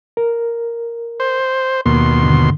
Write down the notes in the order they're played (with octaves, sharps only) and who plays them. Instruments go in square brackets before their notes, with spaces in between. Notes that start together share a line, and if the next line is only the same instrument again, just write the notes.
[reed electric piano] A#4
[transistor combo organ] C5
[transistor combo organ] D#2 B2 C6 [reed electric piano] A#3
[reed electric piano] G2 D3